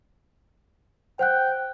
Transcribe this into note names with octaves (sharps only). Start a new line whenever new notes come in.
C5 F#5 G5 F#6